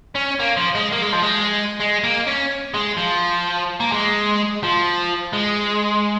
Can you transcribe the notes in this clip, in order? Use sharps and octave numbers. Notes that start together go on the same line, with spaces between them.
C#4
A#3
F3
G#3
A#3
G#3
F3
G#3
G#3
A#3
C#4
G#3
F3
A#3
G#3
F3
G#3